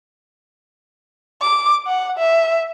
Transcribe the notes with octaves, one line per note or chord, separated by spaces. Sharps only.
D6
F#5
E5